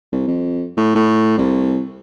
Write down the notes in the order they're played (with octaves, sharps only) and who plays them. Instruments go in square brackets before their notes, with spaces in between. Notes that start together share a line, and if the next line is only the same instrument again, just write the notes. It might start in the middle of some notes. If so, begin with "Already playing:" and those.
[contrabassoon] C2
F2
A2
A2
C2